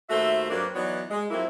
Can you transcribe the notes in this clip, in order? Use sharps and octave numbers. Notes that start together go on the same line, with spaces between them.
D#2 A3 F#4 C5 E5
G2 F#3 A#3 C4 D4
E3 F#3 B3 D#4 C#5 D5
G#3
F2 F#3 A#3 C4 E4